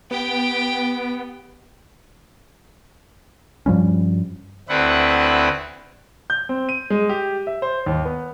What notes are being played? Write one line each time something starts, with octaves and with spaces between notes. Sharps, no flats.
B3 G4 G5
G2 F3 G3 C#4
D2 C4 D4 E4 B4 F#5
G6
C4
D#7
G#3
G4
E5
C5
D#2
B3